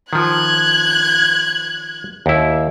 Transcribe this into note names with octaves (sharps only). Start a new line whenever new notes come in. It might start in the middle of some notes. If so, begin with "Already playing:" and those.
D#3 F3 F#6 G#6
D#2 E4